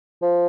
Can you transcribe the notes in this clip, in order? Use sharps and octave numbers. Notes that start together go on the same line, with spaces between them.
F3